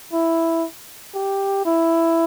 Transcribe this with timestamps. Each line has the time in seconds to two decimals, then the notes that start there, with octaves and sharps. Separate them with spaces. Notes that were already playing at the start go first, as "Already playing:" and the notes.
0.13 E4
1.14 G4
1.65 E4